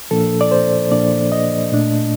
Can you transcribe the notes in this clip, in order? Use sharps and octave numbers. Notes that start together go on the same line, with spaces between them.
A#2 F3 A#3 D4 A4
D5
C5
A#2 F3 A#3 D4 D5
D#5
A#2 A3 D4